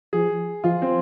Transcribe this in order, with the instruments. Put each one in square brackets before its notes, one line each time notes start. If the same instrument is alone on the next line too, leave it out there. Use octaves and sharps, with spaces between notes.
[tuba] F3 [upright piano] G#4
[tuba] F3 [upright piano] F4
[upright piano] C4